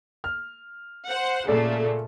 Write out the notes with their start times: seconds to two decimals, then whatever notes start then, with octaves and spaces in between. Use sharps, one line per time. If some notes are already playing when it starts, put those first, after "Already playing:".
0.24 F6
1.08 C5 F#5
1.48 A#2 C#3 A3 A4 D5